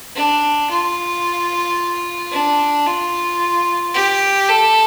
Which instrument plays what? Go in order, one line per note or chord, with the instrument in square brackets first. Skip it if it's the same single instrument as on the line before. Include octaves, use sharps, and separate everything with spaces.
[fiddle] D4
F4
D4
F4
G4
A4